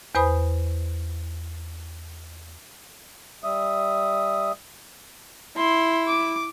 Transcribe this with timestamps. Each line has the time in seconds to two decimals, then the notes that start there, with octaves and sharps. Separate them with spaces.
0.15 E2 B4 C5 G#5 B5 D#6
3.44 G3 E5 D#6
5.57 E4 C6
6.08 D6